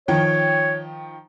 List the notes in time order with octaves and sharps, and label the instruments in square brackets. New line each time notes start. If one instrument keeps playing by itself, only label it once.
[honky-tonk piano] D#3 F3 G5 [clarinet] C#5